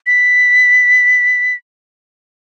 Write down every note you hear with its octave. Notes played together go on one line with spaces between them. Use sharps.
B6